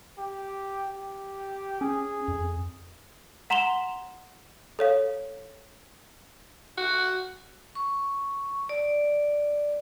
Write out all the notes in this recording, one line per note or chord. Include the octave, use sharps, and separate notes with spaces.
G4
G4
C#4 G#4
F2
F#5 A#5 C6 E7 F7 G7
A4 C#5 F5
F#4
C#6
D5